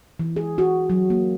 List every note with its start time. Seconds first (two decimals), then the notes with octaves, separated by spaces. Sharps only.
0.19 E3
0.36 G#4
0.58 F#4
0.90 F#3
1.10 A#3